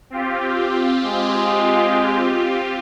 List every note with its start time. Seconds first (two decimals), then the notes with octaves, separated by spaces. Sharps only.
0.10 C4 F4 G4
1.05 G#3